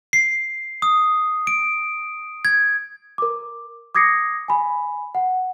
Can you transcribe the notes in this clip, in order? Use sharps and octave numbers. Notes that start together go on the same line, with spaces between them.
C7
D#6
D7
G#6
A#4 D6
D6 D#6 G#6 A#6 C7 C#7
G#5 B5
F#5